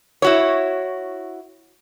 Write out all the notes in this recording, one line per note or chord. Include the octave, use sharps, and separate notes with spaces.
E4 F#4 C#5